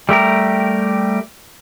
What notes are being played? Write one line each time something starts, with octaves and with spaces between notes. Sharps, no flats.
G3 A3 G4 A#4